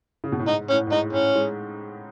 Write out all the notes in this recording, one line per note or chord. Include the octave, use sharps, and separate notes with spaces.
C#3
B2
A2
G#2 D#4
A2 C#4
A2
G#2 D#4
A2 C#4
G#3